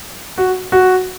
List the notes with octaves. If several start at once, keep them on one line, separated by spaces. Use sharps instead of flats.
F#4
F#4